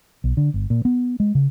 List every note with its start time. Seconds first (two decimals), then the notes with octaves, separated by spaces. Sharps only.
0.24 B1
0.37 D3
0.54 G1
0.70 A#2
0.85 B3
1.20 G#3
1.35 C#3